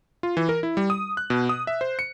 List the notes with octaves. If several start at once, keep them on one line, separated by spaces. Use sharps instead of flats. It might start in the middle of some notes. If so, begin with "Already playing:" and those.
F4
E3
A#4
E4
G3
D#6
F#6
B2
D#6
E5
C5
C#7